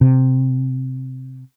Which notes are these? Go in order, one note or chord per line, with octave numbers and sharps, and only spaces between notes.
C3